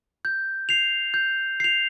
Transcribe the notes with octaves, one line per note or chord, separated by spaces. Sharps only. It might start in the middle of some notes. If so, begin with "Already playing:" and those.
G6
C7 F7
G6
C7 F7